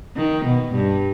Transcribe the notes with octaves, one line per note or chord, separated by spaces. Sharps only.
D#3
B2
G2